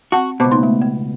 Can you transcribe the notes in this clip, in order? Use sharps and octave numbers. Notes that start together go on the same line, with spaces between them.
C4 F#4 F#5 A5
C#2 B2 C5 A5 D6
A#3 D#4 C6
A3
B3